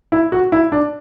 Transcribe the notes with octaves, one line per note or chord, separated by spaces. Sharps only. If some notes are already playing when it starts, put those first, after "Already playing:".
E4
F#4
E4
D4